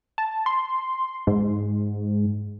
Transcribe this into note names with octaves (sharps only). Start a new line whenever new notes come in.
A5
C6
G#2